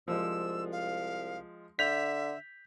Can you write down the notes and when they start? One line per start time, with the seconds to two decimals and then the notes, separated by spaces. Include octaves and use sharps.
0.08 C2 F3 G#3 E6
0.72 F5
1.79 D3 E5 G6 B6 F7